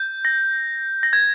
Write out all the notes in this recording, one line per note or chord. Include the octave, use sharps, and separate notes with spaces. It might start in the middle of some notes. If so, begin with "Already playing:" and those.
Already playing: G6
A#6
A#6
G#6